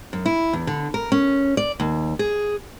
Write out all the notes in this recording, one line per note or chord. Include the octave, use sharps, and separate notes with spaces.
F#2
E4
E2
D3
A#4
C#4
D5
D#2
G#4